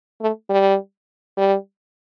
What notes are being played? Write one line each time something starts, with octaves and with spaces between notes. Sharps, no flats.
A3
G3
G3